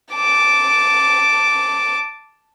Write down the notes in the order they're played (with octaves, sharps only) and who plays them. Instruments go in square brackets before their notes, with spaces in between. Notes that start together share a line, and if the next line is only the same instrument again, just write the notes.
[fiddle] A5 D6